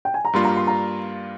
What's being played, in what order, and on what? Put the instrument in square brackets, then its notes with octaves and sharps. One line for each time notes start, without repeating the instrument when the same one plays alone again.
[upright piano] G5
G#5
A#5
[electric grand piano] G2 G3 A#3 F4 [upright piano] C6
[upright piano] A#5
C6
A#5